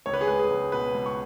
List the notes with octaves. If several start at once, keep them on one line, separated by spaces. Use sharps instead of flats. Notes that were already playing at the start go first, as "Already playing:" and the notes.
C#2 C#5
B4
G#4
G#3 B4
G#4
C#2
B2 B4
C#2
C#6